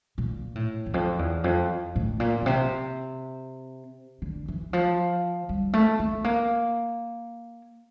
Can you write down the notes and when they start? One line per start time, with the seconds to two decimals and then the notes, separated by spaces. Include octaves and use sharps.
0.18 A#2
0.55 A2
0.86 E2
0.94 F2
1.19 E2
1.44 F2
1.96 A2
2.20 A#2
2.41 A#2
2.46 C3
4.22 D3
4.48 E3
4.73 F3
5.49 G3
5.73 A3
5.99 A3
6.24 A#3